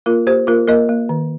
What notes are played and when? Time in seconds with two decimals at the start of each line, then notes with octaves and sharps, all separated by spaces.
0.06 A#3 F4 A#4
0.27 A#3 G4 C5
0.47 A#3 F4 A#4
0.67 A#3 A#4 D#5
0.89 A#3
1.09 D#3